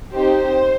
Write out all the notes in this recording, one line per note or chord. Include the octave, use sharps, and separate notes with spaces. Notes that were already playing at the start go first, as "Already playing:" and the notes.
C4 D#4 G4 C5